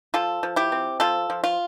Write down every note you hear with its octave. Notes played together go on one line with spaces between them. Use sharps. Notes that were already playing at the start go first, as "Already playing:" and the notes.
F3 F4 A4
F3
E4 G4
C4
F3 F4 A4
F3
F4